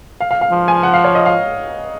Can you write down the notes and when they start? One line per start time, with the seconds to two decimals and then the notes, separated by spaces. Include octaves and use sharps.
0.20 F5
0.31 F5
0.41 F5
0.52 F3
0.68 G#5
0.83 F#5
0.94 F5
1.04 C#5
1.15 D#5
1.26 F5